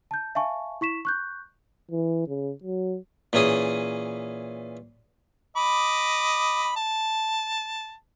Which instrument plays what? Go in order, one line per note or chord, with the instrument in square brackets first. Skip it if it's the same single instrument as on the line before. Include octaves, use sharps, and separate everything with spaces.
[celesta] A5 G6
E5 F5 G#5 A5 C#6
E4 C#6 B6 E7
C#6 F#6 G6
[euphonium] E3
C#3
F#3
[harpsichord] A#2 E3 C#4 G#4 D#6
[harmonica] D#5 B5 D6
A5